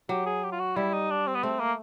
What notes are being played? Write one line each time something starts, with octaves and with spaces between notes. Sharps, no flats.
F#3 G4
G#4
G4
F4
F#4
G3 E4
D#4
D4
C4
B3
A3 C4
A#3